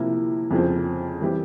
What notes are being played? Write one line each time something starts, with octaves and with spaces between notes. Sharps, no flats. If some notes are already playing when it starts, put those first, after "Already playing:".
Already playing: C3 F3 A#3 E4
F2 C#3 F3 C4
E3 G3 C4 G4